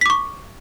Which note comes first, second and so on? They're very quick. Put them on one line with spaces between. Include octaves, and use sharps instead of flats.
B6 D6 C#6